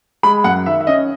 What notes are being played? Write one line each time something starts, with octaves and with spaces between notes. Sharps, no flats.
G#3 B5
F#2 F#5
D#3 E5
E5
C#4 D#5